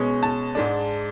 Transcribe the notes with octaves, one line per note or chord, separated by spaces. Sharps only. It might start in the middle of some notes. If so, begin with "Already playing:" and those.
Already playing: B2 G#3 C#4
A5
G#2 G#3 D4